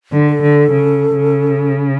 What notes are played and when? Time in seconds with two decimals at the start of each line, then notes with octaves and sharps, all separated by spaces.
0.12 D3
0.27 A4
0.43 D3
0.71 C#3
1.15 C#3